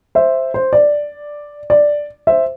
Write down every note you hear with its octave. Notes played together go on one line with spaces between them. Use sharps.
C5 E5
C5
D5
D5
C5 E5